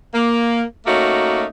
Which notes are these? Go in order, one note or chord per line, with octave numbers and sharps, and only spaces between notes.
A#3
A3 A#3 C#4 D#4 F#4